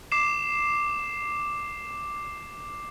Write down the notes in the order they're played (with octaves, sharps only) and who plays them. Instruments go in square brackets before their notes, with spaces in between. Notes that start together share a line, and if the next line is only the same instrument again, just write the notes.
[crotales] D6 C7 E7